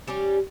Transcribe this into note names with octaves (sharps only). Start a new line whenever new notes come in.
G3 C#4 G4